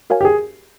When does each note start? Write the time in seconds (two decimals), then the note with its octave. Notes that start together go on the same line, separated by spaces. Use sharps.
0.10 F#4 A#4 C#5 F5 G#5
0.21 G4
0.25 G#4